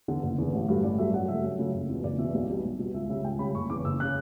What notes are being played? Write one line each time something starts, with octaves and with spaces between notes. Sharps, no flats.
E2 D3
F#1
E2 D3
A1
G2 F#3 A3
A1 D5
G2 F#3 A3 E5
F#2 F#5
C#3 F#3 A3 E5
F#2
C#3 F#3 A3
F#1
E2 B2
F#1 D5
E2 B2 E5
B1
B2 G3
B1
B2 G3
C#2 E5
C#3 G3 E5
C#2 G5
C#3 G3 B5
F#1 C#6
E2 C#3 D6
F#1 E6
F#6
C#3